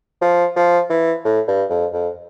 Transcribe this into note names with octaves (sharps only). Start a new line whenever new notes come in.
F3
F3
E3
A2
G2
F2
F2